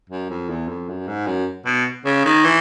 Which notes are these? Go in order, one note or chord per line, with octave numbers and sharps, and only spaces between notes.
F#2
F2
E2
F2
F#2
G#2
F#2
B2
C#3
D#3
E3